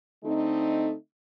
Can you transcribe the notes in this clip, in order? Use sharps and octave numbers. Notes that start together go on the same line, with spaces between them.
D3 A3 C4 D#4